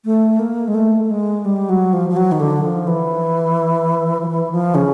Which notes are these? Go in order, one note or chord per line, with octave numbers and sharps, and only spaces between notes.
A3
A#3
G#3
A3
A3
G#3
G3
F#3
F3
F3
F#3
D#3
D3
F3
E3
F3
E3
F3
C#3